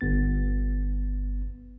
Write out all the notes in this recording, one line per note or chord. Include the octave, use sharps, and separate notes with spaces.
G1 B3 A6